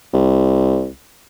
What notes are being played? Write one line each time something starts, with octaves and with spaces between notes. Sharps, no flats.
C2